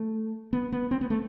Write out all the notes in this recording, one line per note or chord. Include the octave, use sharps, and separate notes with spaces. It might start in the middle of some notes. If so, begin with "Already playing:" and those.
Already playing: A3
B3
B3
C4
B3
A3